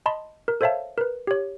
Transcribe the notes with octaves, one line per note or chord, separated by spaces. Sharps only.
D#5 A5 B5 C6
A#4
A4 C5 C#5 E5 F5 A5
A#4 B4
G4 C#5